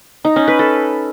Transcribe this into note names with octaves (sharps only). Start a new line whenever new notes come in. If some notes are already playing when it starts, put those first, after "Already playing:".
D#4
C#4
B4
A4